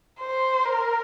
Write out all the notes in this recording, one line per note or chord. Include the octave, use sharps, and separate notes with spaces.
C5
A#4